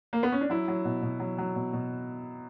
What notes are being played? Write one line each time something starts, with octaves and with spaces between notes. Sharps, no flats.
A#3
B3
C#4
D4
F#3 E4
F#3
B2
B2
F#3
F#3
B2
B2